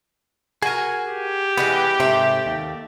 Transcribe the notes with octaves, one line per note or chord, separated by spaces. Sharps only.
F#4 G#4 A#4 G#5
G4
E3 G#3 B3 B4
G#2 C3 A3 E5
D#2